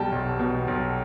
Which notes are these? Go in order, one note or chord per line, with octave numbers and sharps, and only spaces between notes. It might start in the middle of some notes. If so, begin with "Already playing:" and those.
Already playing: B1 B2 G3 G5 A5
B1
B2
B1